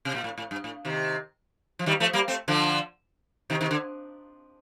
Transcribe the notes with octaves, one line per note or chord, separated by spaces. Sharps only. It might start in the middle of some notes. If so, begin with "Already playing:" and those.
C3
A#2
A2
A2
G2
A2
C3 D#3
F3
D#3 G3
F3 A3
G3 A#3
A3 C4
D3 F3
C3 D#3
C3 D#3
D3